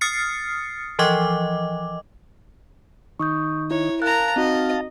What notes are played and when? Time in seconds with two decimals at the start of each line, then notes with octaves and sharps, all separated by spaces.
0.01 D#6 F6 A6 C7 C#7
0.99 E3 F3 D#5 D6
3.19 D#3 D#4 C#6 D#6 G6
3.71 E4 C#5
4.02 A#4 F5 A5 A#5 F#6
4.36 C4 D#4 F#4 D#5